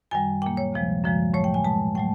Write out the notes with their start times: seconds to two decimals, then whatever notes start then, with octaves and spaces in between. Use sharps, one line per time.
0.11 F#2 D#3 G3 G#5
0.42 A#2 F#3 A#3 G5
0.57 C#5
0.73 D2 C3 F3 G#3
1.03 F#2 D3 F3 G#3
1.34 A2 F#3 A3 C#5
1.44 G5
1.54 G#5
1.65 B2 G#3 A5
1.95 A2 F#3 A3 G5